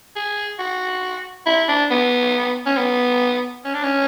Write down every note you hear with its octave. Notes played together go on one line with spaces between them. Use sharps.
G#4
F#4
E4
D4
B3
C#4
B3
C#4
D4
C#4